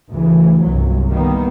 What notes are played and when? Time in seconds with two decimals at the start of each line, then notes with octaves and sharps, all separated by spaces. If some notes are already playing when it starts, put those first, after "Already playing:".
0.12 D2 C#3 E3
0.64 G1 C2 F#3
1.09 D#3 G3 A#3 B3